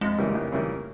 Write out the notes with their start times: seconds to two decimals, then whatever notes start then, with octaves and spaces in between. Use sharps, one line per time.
0.01 F2 G#3
0.18 C#3 E3 G3 A#3
0.35 F2 A3
0.52 C#3 E3 G3 A#3